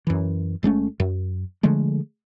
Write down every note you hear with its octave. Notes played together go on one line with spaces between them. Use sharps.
F#2 E3
G1 G#3 A3 C#4
F#2
D3 F3 G#3 A3